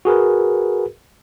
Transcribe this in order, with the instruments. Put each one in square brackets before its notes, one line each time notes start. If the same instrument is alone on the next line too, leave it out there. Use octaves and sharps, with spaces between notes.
[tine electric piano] F#4 G#4 A#4 B4